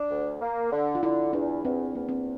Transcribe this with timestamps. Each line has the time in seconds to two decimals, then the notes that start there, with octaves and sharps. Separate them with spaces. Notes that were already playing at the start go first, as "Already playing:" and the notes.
Already playing: D4
0.10 D2
0.41 A#3
0.72 D3
0.95 F4
1.03 D3 E4
1.33 E2 D4
1.64 E2 C4
1.95 E2 A#3
2.09 C4